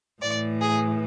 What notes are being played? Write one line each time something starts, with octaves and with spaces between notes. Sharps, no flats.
A2 E3 D5
G#4